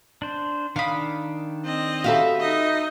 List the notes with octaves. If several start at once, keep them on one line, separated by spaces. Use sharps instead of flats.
D4 C5
D#3 D4 F5 B5 D#6
C4 D#5
F#4 G4 A4 B4 E5 F5
D#4 D#5